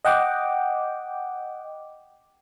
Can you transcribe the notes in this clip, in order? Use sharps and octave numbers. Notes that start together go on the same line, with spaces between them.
D#5 F#5 G5 D6